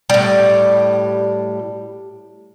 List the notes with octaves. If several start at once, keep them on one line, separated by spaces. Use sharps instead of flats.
A2 G3